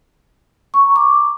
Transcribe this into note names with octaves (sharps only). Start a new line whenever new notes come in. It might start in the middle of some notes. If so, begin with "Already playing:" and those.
C#6
A#5
D6